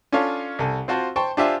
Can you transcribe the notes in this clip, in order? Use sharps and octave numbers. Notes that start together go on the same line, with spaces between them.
C#4 D4 F4 A4 C#5 F5
C2 A4 G#5
C4 F4 F#4 C5 A5
C5 G5 A5 C#6
D4 F4 G4 C5 E5 G#5